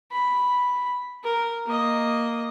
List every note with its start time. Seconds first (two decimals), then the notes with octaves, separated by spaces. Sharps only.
0.12 B5
1.23 A#4
1.66 A#3 D#5